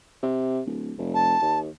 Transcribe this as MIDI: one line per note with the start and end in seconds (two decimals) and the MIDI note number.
0.23 0.61 48
0.66 0.93 26
0.98 1.36 29
1.14 1.59 81
1.42 1.69 39